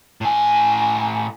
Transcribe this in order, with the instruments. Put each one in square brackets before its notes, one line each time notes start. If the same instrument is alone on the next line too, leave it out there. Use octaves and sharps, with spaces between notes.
[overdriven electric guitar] A2 G#5